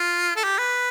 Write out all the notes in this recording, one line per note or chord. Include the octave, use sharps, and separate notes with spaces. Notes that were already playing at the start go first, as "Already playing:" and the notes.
Already playing: F4
A4
G4
B4